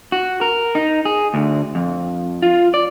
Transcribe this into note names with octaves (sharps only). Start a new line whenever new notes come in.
F#4
A#4
D#4
G#4
D2
F2
F4
D5